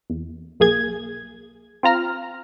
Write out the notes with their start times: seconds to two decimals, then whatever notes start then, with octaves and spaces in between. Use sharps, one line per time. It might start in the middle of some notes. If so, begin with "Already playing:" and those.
0.10 E2
0.60 B1 A#3 G#4 G#6
1.83 C4 F4 A#5 F6